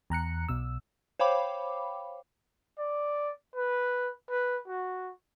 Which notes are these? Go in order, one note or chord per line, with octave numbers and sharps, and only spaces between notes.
E2 A#5 F#6 C#7
B1 B2 E6
C5 C#5 F5 G5 B5 D6
D5
B4
B4
F#4